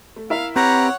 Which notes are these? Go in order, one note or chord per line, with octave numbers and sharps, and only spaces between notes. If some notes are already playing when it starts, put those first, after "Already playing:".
A3
E4 A#4 E5 F5
C4 G4 B4 C#5 F#5 A#5